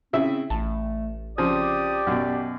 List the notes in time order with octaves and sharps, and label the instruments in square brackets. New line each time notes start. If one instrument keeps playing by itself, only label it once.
[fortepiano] C#3 E4 E5 [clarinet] C4
[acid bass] A1 [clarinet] A3 [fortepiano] A5
[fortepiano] C#3 F3 C4 [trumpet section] G4 D5 [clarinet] D#6
[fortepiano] F#2 B2